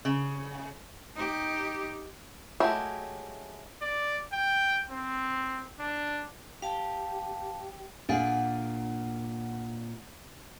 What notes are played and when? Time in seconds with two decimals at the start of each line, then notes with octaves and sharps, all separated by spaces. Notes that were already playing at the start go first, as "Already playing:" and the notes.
0.05 C#3
1.16 D#4 G4
2.60 F#3 G#3 A3 E4 G4
3.82 D5
4.33 G5
4.90 C4
5.80 D4
6.62 G4 F5 A5
8.09 A#2 D4 G#4 F5 F#5